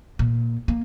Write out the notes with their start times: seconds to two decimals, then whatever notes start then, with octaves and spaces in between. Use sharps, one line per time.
0.19 A#2
0.68 A#3